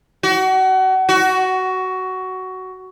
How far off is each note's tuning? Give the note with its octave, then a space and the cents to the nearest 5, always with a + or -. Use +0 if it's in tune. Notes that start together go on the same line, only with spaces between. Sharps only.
F#4 +30
F#4 +15